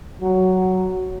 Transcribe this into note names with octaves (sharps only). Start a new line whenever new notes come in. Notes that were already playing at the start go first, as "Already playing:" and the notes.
F#3